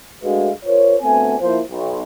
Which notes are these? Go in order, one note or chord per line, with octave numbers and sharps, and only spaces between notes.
G#3 A3 D4 F#4 B4 F5
F4 A#4 C5 C#5
D2 A3 B3 C4 G#5
F3 A#3 E4 C5
B1